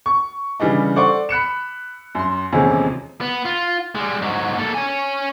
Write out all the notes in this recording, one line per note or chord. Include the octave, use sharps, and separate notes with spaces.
C#6
C#3 E3 G3 D4 D#4
A4 C5 D5 F#5 C#6
B5 F#6 C#7 E7
F#2 C6
D#1 E2 C3 G#3 C#4
B3
F4
G3 G#3
G#2 F#3
A#3 A4
C#5 G#5